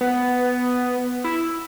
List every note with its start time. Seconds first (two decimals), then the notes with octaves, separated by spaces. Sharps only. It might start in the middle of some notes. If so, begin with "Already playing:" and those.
0.01 B3
1.24 E4